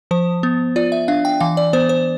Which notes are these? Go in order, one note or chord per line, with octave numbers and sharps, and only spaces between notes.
F3 C5
B3
F4 D5
E5
D4 F5
G5
E3 F5
D5
B3 C5
C5